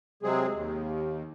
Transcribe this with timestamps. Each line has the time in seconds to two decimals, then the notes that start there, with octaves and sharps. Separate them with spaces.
0.23 C3 F#3 G#3 C4 G#4
0.53 D#2